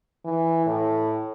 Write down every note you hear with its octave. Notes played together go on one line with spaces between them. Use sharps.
E3
A2